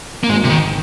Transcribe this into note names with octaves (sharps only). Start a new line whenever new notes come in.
A#3
G#1 G#3
C3
D#3